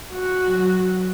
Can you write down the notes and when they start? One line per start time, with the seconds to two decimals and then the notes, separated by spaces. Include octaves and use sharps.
0.12 F#4
0.46 F#3